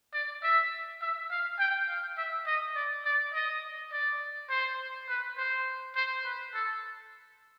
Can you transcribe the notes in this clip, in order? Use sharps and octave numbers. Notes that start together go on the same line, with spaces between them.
D5
E5
E5
F5
G5
F5
E5
D#5
D5
D5
D#5
D5
C5
B4
C5
C5
B4
A4